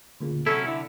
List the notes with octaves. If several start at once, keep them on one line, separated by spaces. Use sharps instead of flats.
D2 A#2 C#3
C3 F#3 C#4 E4 A4
D3 E4